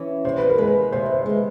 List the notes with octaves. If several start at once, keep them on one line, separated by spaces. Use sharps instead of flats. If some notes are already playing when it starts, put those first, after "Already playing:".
Already playing: E3 C#4
C3 C5
B4
A#4
G#3 B4
C3 C5
C5
G#3 B4